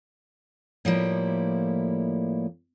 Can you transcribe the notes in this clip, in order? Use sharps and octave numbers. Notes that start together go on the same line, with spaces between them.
A2 F3 G3 A#3 E4